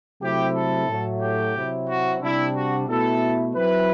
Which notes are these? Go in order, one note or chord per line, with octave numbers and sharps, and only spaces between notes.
C3 F#3 A3 C4 E4 G4
A4
A2 F#3 A3
G4
C3 F#3 C4 E4
F#4
C3 G3 D4 E4
F#4
B2 A3 E4 A4
F#3 C4 E4 B4